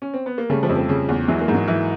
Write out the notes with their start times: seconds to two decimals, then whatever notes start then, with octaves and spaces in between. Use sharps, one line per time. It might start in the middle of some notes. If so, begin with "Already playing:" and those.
0.02 C#4
0.14 C4
0.26 B3
0.38 A#3
0.50 C#3 G3 A3
0.63 F3 G3
0.69 F2
0.76 F3 G3
0.89 C#3
1.09 E2
1.28 E3 F#3 G#3
1.41 G#3 A#3
1.48 G#2
1.54 F#3 G#3
1.68 E3